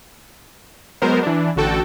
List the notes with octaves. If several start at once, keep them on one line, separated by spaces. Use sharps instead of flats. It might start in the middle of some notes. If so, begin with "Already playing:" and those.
F#3 G#3 B3 A#4 C5
E3 D4
A1 D3 F#4 A4 G5